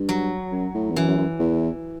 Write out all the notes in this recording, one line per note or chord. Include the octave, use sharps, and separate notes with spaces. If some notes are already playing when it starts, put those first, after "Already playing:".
Already playing: G2
F#3
F#2
A2
E2
F#2 E3
F#2
F#2
E2